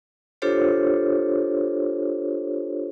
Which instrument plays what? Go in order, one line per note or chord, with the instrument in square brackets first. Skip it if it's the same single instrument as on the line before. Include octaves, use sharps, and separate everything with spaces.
[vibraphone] D4 F4 G4 A4 C5 C#5